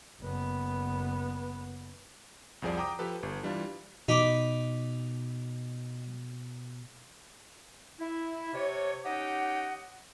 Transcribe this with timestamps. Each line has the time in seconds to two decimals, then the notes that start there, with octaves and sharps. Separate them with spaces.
0.20 F#1 B3
2.62 C2 F2 F3 G#4 D5
2.77 G5 A#5 D6 D#6
2.99 F3 G4 A4 B4
3.23 G1
3.43 E3 G3 D4 F4
4.08 B2 D#4 B5 D6
8.00 E4
8.54 C3 C#5
9.05 C#4 D#4 G4 D#5 F#5